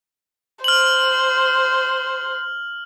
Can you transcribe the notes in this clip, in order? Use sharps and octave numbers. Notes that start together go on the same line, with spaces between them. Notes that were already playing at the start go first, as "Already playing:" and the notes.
C5 F6 F#7